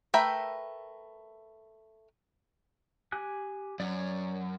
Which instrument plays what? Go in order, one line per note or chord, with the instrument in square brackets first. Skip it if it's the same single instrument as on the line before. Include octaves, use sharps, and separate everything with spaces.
[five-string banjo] A3 A#4 B4 E5 G5
[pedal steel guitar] G4 G#5 F#6
[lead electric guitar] F#2 [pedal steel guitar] C#5 D5